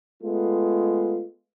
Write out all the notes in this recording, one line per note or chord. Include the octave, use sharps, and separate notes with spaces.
G#3 A3 B3 F4